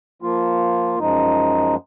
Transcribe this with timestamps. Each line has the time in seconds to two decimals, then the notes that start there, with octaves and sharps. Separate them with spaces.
0.22 F3 A#3 F4
0.99 F#2 F3 G#3 D#4